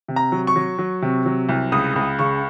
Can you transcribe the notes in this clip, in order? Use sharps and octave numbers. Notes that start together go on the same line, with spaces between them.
C3
A#5
F#3
C#6
F#3
F#3
C3
F#3
C2
C#2 D#6
C#2
C#3 C#6